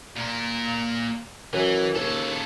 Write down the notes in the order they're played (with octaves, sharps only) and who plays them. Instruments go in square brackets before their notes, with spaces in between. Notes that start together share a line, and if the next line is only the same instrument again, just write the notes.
[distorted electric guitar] A#2 A#4
[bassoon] F#2 [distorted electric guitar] E3
[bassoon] D#2 [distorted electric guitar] C#3 A4